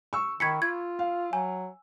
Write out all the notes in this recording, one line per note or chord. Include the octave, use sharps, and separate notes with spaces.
C#6 E6
D#3 B5 C#6 G#6 B6 C#7
F4 G#6
F5
F#3 G#5